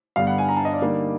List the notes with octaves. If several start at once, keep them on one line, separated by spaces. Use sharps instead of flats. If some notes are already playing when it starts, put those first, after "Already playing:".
G2 D3 G3 B3 F5
F#5
G#5
A#5
A5
D#5
D5
D3 G3 A#3 D#4